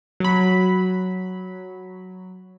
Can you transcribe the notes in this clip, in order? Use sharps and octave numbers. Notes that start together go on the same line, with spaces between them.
F#3 B5